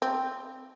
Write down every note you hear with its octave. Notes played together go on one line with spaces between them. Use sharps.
C4